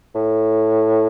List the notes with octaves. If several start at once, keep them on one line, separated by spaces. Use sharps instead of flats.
A2